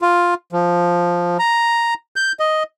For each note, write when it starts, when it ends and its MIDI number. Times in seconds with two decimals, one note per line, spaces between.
0.02 0.34 65
0.52 1.37 53
1.39 1.94 82
2.16 2.32 91
2.40 2.63 75